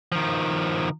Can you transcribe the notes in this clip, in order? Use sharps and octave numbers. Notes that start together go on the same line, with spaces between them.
D#3 F3